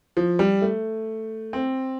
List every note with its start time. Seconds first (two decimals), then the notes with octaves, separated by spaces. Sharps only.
0.17 F3
0.39 G3
0.62 A3
1.53 C4